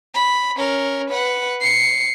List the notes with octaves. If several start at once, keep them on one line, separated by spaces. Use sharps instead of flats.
B5
C#4 A#4
B4 F#5
C7 C#7